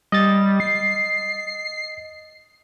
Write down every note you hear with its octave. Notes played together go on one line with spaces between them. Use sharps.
G3 D#5 A6
C7